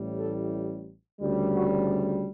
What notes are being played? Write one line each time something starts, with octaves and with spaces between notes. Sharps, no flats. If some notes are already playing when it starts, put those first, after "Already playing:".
Already playing: A1 A2 G3
A4
D2 C#3 G3
F#4